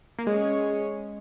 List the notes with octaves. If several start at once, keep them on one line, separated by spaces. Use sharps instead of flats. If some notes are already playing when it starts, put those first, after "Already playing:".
A#3
G#3 C#4 G#4 C#5